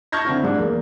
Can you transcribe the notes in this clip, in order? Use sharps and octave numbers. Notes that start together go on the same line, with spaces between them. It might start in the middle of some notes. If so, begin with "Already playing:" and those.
A5 C#6 F6 G6 G#6 A#6
D3 C4 E4
G#2 G3 D4
E2 A#3